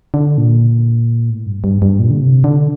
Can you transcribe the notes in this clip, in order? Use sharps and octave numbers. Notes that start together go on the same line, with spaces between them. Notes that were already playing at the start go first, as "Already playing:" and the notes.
D3
A#2
A2
G2
G2
G2
A#2
D3
C3
D3